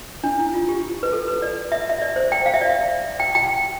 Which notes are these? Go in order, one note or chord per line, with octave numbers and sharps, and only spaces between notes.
D4
E4
F4
G4
B4
A4
B4
D5
E5
E5
D5
C5
G5
F5
E5
D5
E5
G5
G5